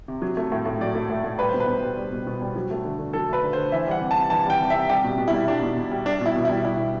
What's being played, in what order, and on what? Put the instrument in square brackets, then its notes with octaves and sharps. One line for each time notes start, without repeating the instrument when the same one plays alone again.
[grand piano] C3
F#3
A3
A2
A2
F#3 D5
A3
A2
A2
G3 B4
C5
B2
B4
B2
G3
G3
B2
B2
G3
F#3
A3
D3
D3
F#3 A4
A3 B4
D3
C5
D3
E3 E5
G3 F#5
C3
A5
C3
E3 A5
G3 G5
C3
E5
C3
G3 G4
B2
B2
E4
G3
G3 D4
B2
B2
G3
G3 D4
B2 E4
B2
E4
G3
G3 E4
B2